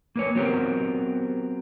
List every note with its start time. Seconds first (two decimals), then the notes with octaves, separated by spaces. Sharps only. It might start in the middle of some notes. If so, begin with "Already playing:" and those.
0.16 A#3 B4 C#5
0.35 F#3 B3 C4 G4 A#4